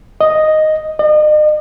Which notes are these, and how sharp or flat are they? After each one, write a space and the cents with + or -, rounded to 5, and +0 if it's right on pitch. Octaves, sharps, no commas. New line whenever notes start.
D#5 +0
D#5 -40